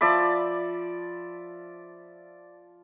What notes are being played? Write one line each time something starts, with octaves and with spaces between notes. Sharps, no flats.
F3 D5 E5 B5